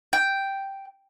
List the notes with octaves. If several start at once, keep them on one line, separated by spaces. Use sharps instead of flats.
G5